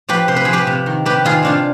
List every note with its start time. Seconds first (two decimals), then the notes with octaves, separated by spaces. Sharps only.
0.09 F3 G4 B4
0.28 C3 C5
0.36 B4
0.45 F3 G#4
0.53 G4 B4
0.67 C3
0.86 D#3
1.05 C3 G4 B4
1.25 D#3 F4 G#4
1.43 C3 D4 F4